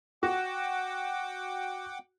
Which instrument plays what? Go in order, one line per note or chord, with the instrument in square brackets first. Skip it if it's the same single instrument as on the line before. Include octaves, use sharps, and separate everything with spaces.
[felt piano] F#4 [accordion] F#5 G5 D6